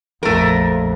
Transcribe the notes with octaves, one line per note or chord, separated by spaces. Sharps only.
A#1 F2 A3 A#4